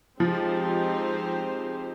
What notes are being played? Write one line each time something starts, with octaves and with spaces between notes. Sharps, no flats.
F3 G#3 C4 D#4 G4 C5